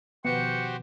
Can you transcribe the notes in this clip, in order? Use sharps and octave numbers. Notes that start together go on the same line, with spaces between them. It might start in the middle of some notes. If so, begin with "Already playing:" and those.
B2 D#3 F3 B3 F#4 G4 C5 C#7